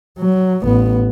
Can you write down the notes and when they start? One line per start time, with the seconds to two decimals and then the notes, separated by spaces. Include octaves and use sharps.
0.19 F#3
0.63 A1 B3